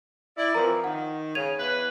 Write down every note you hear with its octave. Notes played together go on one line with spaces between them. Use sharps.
E4 D5
E3 F3 C4 A#4 A#5
D#3 F#5
C#3 G#6 D#7 F7
E2 B4